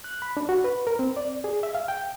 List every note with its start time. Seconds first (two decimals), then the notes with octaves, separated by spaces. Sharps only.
0.04 F#6
0.22 B5
0.37 D4
0.49 F#4
0.64 B4
0.87 A#4
0.99 C4
1.17 D5
1.44 G#4
1.63 E5
1.75 F5
1.88 G5